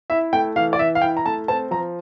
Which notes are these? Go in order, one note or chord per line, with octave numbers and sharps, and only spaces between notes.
E4 E5
A3 G5
E3 F5
D5
E3 E5
F5
E4 G5
A#5
A3 A5
C4 A5
F3 A#5